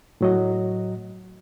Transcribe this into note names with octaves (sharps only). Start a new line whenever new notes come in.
A2 F#3 D#5